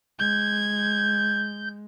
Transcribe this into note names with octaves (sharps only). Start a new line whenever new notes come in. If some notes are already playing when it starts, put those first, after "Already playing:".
G#3 G6 G#6